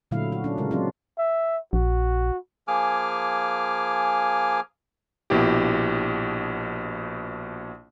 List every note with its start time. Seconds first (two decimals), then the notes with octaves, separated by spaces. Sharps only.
0.11 A#2 D3 F#3 A3 E4 F5
0.32 F#4
0.44 C#4 D4
0.58 C#3 G#3 A#4
0.71 F#3 C4 D4 F4
1.19 E5
1.73 A#1 F#4
2.68 F3 A#3 G#4 G#5 D6 F6
5.30 A#1 B2 E4 G4